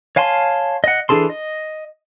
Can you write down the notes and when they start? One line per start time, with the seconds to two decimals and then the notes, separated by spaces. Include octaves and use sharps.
0.16 C#5 F5 G#5 A5 C6
0.84 D#5 F#5
1.09 E3 D4 G#4 A4 C6
1.29 D#5